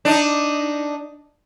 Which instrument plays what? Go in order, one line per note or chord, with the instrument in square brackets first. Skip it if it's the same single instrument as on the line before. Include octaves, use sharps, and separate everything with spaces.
[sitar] D4 D#4